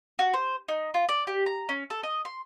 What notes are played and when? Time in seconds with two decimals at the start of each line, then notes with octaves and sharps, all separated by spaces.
0.19 F#4
0.34 C5
0.68 D#4
0.94 F4
1.09 D5
1.27 G4
1.46 A#5
1.69 C#4
1.90 A4
2.03 D#5
2.25 C6